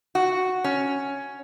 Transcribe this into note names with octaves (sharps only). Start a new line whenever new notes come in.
F#4
C#4